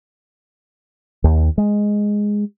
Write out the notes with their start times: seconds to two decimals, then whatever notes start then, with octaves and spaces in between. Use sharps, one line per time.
1.24 D#2
1.58 G#3